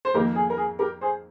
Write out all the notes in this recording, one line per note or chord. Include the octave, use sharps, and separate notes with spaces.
C5
F2 D#3 A#3 D#4 G4 A#4
G#4
A#4
G#4
G4 A#4
G#4 C5